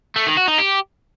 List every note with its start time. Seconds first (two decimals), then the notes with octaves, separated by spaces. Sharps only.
0.16 A3
0.26 D#3
0.37 F#4
0.48 D#4
0.58 G4